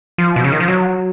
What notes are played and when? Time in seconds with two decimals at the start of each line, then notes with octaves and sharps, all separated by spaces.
0.18 F3
0.36 B2
0.44 C#3
0.52 D#3
0.60 F3
0.68 F#3